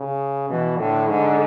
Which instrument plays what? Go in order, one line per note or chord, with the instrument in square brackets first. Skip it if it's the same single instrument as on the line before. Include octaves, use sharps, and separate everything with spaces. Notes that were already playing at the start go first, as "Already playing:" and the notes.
Already playing: [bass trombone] C#3
[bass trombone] B2 [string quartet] E3
[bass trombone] A2 [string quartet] D3
[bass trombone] G#2 [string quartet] D3